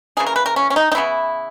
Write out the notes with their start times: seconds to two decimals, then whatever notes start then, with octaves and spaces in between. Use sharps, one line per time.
0.17 C#3 E3 A#3 G#4
0.27 A#4
0.36 B4
0.46 A#4
0.56 C#4
0.70 C#4
0.76 D#4
0.92 D#4
0.95 C#3 E3 B3 E4